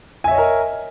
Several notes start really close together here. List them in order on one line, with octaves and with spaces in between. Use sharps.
G#5 E5 C#5 D#5 A#4